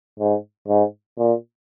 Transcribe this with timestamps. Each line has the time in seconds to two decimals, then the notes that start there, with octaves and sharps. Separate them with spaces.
0.20 G#2
0.68 G#2
1.18 A#2